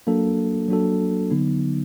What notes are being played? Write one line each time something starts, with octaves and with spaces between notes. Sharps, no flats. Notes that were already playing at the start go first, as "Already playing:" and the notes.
F#3 A#3 D4 F#4 A4
F#3 A#3 D4 F#4 A4
D3 F#3 B3 D#4